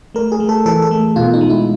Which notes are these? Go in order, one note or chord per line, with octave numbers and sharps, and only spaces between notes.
A3 A#4
G#4
A3
A4
E3 A4
A4
A3
B2 F4
D#4
G#3
E4